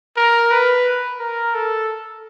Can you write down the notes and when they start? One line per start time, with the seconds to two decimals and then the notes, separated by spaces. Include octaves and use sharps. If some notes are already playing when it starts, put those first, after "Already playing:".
0.17 A#4
0.51 B4
1.20 A#4
1.55 A4